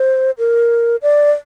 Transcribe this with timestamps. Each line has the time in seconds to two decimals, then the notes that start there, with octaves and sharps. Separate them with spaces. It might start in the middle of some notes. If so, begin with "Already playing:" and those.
Already playing: C5
0.38 A#4
1.02 D5